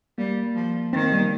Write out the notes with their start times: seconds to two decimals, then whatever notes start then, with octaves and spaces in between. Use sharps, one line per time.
0.18 G3 A#3
0.56 F3
0.93 D#3 C4
1.02 A#3
1.12 G3
1.22 A#3